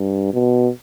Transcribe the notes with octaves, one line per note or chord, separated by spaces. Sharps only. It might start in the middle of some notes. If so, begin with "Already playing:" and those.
Already playing: G2
B2